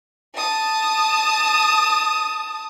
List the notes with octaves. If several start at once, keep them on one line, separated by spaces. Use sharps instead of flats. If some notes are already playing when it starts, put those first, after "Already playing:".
A5 D#6